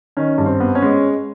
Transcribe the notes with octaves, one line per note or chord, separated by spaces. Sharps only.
D#3 C#4
G2
C4
B3
C#4
G#3